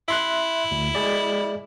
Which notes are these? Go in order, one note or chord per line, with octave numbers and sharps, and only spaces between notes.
E4 E5 C6 F#6
D2
G#3 G#4 D5